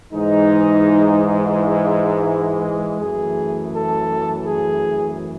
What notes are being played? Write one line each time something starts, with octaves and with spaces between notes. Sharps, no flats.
G#2 E3 G#3 D#4
E4
F#2 E3 A3 G#4
A4
G#4